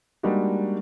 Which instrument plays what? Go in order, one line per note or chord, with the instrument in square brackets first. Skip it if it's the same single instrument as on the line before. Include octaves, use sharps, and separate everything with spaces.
[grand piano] G3 G#3 A#3 D4 D#4 F#4